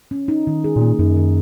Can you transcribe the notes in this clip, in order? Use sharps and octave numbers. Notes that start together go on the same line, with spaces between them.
C#4
D#4
D#3
G#4
A#2 A#3
F#2 D#4
D#3